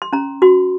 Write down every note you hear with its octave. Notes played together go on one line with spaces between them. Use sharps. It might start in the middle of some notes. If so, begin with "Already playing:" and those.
C6
C#4 A#5
F#4 C6